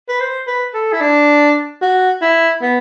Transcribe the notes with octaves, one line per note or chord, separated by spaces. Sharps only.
B4
C5
B4
A4
E4
D4
F#4
E4
B3